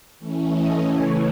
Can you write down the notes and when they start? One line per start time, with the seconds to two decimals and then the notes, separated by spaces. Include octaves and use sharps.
0.19 E3 A3 C#4
0.52 D#5
0.85 C#3 E3 A3 C#5